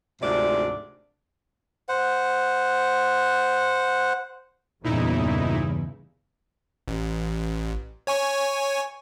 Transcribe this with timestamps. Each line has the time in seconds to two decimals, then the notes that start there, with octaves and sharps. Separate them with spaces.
0.22 D2 G#2 C3 F3 D4 D5
1.89 C5 F#5
4.84 E2 G2 A#2 C#3 D#4 E4
6.88 A1
8.07 C#5 G#5 C#6